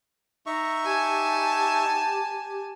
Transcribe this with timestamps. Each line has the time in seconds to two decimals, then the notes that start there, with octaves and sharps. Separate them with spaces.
0.46 D#4 E5 A#5 C#6
0.85 G4 G#5 A5